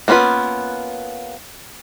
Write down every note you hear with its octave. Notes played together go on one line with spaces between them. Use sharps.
A#3 B3 C#4 F4 B4